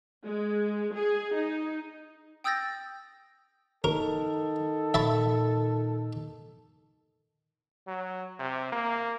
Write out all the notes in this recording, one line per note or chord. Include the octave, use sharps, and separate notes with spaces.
G#3
G#4
D#4
G5 D#6 E6 G6 A6 A#6
D#3 A4 A#4
A#2 E5 A5 B5
F#3
C3
A#3